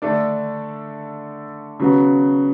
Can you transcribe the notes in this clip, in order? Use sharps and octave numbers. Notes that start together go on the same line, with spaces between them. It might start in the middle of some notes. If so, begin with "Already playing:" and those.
D3 A3 D4 A4 D5
C#3 F#3 B3 F#4